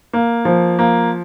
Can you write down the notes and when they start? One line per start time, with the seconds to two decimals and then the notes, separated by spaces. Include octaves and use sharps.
0.13 A#3
0.45 F3
0.79 A#3